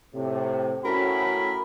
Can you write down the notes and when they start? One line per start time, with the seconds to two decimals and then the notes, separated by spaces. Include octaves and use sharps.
0.15 A2 C3
0.85 A2 C#4 F#4 A#4 B5